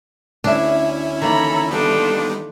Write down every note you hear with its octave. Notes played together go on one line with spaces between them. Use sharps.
D2 C#4 D4 E4 E5
D#3 E3 A#3 A4 A#5 B5
G3 B3 D4 D#4 F4 A4